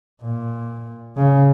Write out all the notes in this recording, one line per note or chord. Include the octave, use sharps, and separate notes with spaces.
A#2
C#3